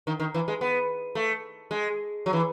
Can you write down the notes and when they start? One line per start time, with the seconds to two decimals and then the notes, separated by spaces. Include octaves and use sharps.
0.07 D#3
0.20 D#3
0.34 E3
0.48 G#3
0.61 B3
1.15 A3
1.71 G#3
2.26 F#3
2.33 E3